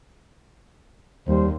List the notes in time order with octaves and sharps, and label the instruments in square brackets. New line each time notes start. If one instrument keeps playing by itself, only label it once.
[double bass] D#2 [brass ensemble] G3 C5